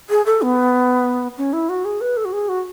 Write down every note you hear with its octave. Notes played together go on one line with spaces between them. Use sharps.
G#4
A4
B3
C#4
E4
F#4
G#4
B4
A4
F#4
G#4
F#4